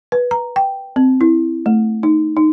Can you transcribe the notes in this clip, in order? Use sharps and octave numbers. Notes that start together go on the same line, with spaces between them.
B4
A#5
G5
C4
E4
A3
D#4
D#4